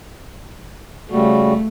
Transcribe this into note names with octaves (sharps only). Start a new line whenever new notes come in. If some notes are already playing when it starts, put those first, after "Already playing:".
C#3 G3 A3 F#4